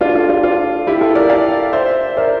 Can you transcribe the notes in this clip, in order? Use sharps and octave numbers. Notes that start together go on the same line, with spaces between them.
D4 F4
F4 A4
D4 F4
D4 F4
E4 G4
F4 A4
A#4 D5
D5 F5
C5 E5
A#4 D5